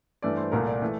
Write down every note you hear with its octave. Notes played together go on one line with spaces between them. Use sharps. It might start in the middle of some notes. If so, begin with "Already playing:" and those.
G2 E3 A3 D5
C5
C2 A#2 A3 A#4
D5
E3 A3